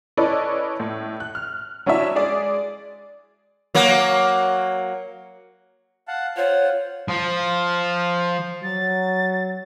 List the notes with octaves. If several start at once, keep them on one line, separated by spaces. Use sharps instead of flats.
C#4 E4 A4 B4 D5 D#5
A2
F#6
F6
F#3 C#4 D4 E4 E5
G#3 G#4 D5
F#3 A#3
F5 F#5 A5
F4 C5 C#5 F#5
F3
F#3 A6